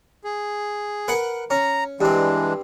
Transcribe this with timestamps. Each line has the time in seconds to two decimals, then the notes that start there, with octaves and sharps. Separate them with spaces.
0.24 G#4
1.08 A#4 B4 F#5
1.50 C#4 A#5
2.01 G2 E3 G#3 C4 D4